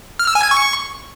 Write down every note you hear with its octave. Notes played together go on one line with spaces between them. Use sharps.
F6
E6
G#5
G#6
C#6